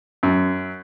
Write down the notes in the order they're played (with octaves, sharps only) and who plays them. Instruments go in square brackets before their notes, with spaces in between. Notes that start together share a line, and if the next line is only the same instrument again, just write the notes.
[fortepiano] F#2